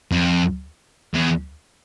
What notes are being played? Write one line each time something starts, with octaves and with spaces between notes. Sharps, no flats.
F2
E2